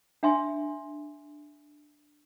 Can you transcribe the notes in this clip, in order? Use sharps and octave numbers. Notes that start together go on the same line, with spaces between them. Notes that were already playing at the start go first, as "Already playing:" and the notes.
D4 E5 G#5 C6